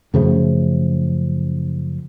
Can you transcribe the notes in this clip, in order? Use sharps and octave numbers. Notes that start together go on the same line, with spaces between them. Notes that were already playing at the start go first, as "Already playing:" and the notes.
F#2 C#3 F3 A3